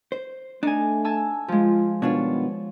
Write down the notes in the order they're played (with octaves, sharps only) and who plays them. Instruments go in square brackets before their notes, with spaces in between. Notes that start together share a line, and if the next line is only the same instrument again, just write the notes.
[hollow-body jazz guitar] C5
[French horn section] A3 [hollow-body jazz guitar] D4 [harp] D#4 G#5
[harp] G#5 A5 E6
[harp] F3 G#3 [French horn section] F4
[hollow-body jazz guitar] B2 D4 F4 [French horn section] D#3 G3 B3 [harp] C#5